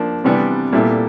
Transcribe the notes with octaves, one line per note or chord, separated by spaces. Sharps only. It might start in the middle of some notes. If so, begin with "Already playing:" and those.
Already playing: F3 A#3 D4
C3 E3 G3 B3 D4
A#2 G3 B3 E4 A4